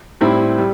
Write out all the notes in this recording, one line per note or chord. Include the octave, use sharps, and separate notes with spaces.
A2 G3 C4 E4
G3